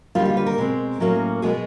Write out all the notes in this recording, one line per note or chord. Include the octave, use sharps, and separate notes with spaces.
D#2 D3 G3 A#3 F4
F4
B4
A#4
B2 G#3 C4
A2 F#3 A#3 C#4
B2 G#3 B3 G#4